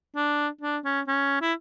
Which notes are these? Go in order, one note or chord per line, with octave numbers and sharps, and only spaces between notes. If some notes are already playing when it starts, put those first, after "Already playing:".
D4
D4
C#4
C#4
E4